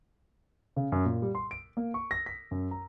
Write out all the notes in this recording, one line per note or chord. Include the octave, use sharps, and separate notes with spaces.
C#3
F#2
A#2
G3
C6
D7
A#3
C#6
A#6
B6
F#2
A#5